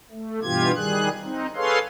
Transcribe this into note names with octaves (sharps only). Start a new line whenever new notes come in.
A3
G2 B2 E3 F4 G4 G#6
D#3 G3 G#4 F#6
C4 D#4
G#4 A4 B4 C#5 F5 C6